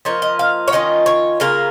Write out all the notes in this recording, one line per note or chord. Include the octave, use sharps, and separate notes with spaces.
F3 A#3 D#4 C#5
D#5
F5
C#5
D#3 C#4 F4 D#5
C#5
C#3 A#3 F4 A#4